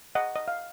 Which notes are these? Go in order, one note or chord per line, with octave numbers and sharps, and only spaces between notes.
D#5 F#5
D#5
F5